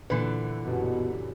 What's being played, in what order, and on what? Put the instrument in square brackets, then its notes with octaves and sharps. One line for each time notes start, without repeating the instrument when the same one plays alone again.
[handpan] A#2 B4 [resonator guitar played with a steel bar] D3 E3
[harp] G1 F#2 [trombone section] B2